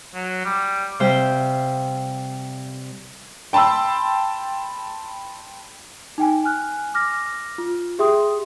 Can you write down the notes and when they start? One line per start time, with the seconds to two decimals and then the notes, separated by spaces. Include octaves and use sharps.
0.14 F#3
0.44 G3
1.00 C3 G3 C5 F5 G5
3.53 G5 A5 B5 C6 E6
6.18 D#4 G5 G#5
6.44 G#5 F6 F#6
6.94 D6 F6 A#6
7.58 F4
7.99 G4 G#4 E5 G5 C6 D#6